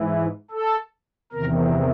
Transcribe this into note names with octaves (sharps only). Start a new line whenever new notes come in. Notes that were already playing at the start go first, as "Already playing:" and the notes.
Already playing: G#2 E3
A4
E2 C3 D#3 A#4